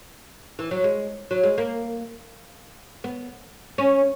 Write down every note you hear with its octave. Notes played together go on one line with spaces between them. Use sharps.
E3
F#3
G#3
F#3
G#3
A#3
B3
C#4